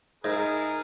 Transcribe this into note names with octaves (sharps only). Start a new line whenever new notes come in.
G#2 E4 G#4 A#4